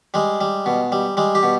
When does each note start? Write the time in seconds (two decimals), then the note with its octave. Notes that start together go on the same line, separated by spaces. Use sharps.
0.14 G3 G#3
0.41 G3
0.66 B2
0.92 G3
1.17 G3 G#3
1.35 G4
1.43 B2